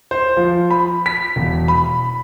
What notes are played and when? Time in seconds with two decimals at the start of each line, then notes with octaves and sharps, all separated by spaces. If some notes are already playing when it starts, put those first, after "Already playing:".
0.11 C5
0.37 F3
0.71 B5
1.06 B6
1.36 E1
1.68 B5